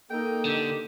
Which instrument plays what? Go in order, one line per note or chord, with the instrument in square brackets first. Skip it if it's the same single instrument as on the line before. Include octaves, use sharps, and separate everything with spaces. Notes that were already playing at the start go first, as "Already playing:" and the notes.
[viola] A#3 D#4 [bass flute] A4 [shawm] G5
[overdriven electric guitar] D3 [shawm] G4